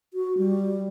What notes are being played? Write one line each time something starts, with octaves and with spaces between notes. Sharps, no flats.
F#4
G3